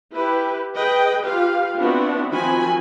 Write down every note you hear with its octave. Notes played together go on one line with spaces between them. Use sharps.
E4 G4 B4
G#4 B4 D#5 G5
F4 G4 B4 F5
B3 C4 D4 E4 F#4
D#3 F3 C4 F#4 G#5 B5